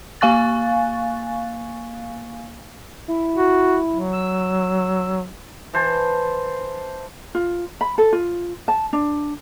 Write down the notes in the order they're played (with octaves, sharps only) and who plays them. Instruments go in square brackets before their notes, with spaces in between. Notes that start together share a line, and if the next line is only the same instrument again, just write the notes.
[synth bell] A#3 F5 G#5 C#6 F#6 A6
[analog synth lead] E4
[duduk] F#4
F#3
[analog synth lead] E6
[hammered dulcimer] E3 C5 A5
[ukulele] F4
B5
A4
F4
A5
D4